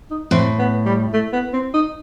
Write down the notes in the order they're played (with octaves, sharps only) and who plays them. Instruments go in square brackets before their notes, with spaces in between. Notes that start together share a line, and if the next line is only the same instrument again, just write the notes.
[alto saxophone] D#4
[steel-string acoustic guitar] A2 [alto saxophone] C4
[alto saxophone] B3
G3
A3
B3
C4
D#4